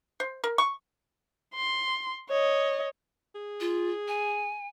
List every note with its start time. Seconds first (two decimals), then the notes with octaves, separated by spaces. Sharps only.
0.20 C5
0.44 A#4
0.58 C#6
1.55 C6
2.29 C#5 D#5
3.35 G#4
3.60 F4
4.08 G#5